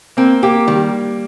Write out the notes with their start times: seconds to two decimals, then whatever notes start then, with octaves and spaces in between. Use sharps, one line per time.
0.17 A#3 C4
0.43 A#3 G4
0.67 D#3 G3